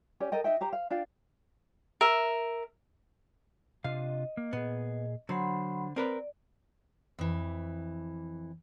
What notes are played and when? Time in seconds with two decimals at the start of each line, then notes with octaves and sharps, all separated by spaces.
0.20 C#4 G4 D5
0.32 A4 A#4 D#5 G5
0.44 D#4 D#5 E5 G5
0.61 G4 C5 A#5
0.73 F5
0.90 D4 F4 F5 G5
2.01 A#4 E5
3.84 C3 D4 F4 D#5 F5
4.37 A#3
4.53 A#2 B3 G#4
5.29 D3 F#3 D4 C5 F#5 B5 C6
5.96 C4 A#4 B4 D5
7.19 F2 E3